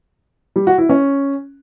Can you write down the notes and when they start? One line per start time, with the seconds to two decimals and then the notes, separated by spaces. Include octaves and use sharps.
0.56 G3
0.67 F#4
0.78 E4
0.89 C#4